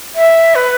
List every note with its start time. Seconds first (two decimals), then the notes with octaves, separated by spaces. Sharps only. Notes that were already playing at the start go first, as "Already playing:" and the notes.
0.15 E5
0.55 B4